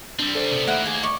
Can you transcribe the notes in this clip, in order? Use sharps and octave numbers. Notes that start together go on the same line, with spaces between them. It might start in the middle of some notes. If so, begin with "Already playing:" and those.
G3 C4 D4
A4 C5 D5
C3 B3
D#3 A3 A#3 E4 F#5
G#4 G#5
D5 C#6